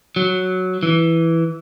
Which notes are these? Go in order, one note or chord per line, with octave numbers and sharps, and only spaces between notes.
F#3
E3